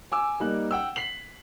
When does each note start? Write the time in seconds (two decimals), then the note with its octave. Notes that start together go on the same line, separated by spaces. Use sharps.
0.12 G#5 D6 E6
0.40 G3 A#3 D#4 A#4 F#6
0.71 F#5 G5 E6
0.96 B6 C7 F#7